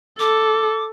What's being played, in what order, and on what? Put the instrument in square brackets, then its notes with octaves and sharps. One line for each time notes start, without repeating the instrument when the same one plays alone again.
[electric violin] A4 [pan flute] D6